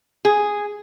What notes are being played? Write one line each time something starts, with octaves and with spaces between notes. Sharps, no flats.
G#4